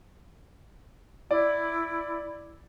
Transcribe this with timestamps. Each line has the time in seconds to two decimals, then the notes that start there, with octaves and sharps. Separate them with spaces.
1.31 E4 D5